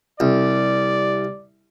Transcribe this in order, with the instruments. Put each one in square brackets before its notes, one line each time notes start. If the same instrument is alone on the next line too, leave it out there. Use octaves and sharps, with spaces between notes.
[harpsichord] C2 [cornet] D5